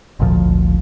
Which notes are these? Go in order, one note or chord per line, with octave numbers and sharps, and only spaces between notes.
G#1 D2 A#2 F3